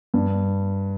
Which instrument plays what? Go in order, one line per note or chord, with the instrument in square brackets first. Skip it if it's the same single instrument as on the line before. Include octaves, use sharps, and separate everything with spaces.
[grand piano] G2